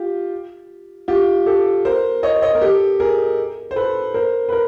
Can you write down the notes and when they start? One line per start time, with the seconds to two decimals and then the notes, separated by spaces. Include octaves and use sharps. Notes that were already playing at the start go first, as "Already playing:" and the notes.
Already playing: F4 G4
1.08 F4 G4
1.46 G4 A4
1.85 A#4 C5
2.23 C#5 D#5
2.42 C#5 D#5
2.55 A#4
2.61 G4 A4
3.00 G#4 A#4
3.71 C5
3.76 A4 B4
4.14 A#4 C5
4.49 B4
4.52 A#4